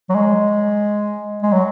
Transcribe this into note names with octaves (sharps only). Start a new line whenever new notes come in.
F#3
G#3
G#3
F#3